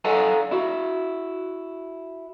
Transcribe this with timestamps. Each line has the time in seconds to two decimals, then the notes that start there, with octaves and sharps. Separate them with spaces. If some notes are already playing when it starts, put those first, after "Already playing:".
0.05 A4 D5 F5 F#5 G#5 A#5
0.51 E4 F#4